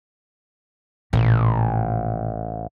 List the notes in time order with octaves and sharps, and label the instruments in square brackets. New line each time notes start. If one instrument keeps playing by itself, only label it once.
[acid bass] A1 [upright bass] A#2 D#3